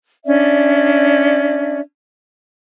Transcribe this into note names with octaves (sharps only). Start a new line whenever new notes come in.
C#4 D4 D5 E5